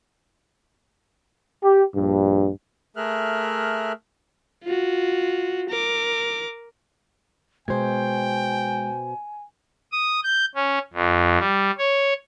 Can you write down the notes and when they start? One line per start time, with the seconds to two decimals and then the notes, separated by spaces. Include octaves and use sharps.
1.63 G4
1.95 A#1 G2
2.96 A3 G#4 A#4 E5 F6 F#6
4.64 F4 F#4
5.69 A#4 D6
7.68 B2 G#3 C5 G5 G#5 G#6
9.92 D#6
10.24 G6
10.55 C#4
10.93 F2
11.39 G3
11.78 C#5